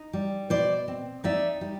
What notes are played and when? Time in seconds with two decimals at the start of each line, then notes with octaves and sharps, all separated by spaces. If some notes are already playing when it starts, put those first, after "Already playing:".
Already playing: D#4
0.13 G3
0.50 B2 C5 D5
0.88 C4
1.24 D#4 D5 E5
1.61 G3